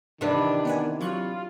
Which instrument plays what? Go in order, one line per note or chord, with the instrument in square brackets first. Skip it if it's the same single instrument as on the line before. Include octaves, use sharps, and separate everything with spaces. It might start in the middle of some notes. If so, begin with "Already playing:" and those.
[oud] C3 E3 B4 [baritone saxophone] D#3 [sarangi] D4
[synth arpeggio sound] B3 F#5 G#5
[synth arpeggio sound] F#3 C#6 F#6 [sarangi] F4